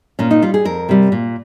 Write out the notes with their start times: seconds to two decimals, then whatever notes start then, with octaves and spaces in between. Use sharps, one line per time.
0.19 A#2 C#4
0.31 D#4
0.42 G3 F4
0.54 G#4
0.65 F2 A#4
0.89 C3 G3
1.12 A#2